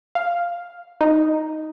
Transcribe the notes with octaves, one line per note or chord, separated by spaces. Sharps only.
F5
D#4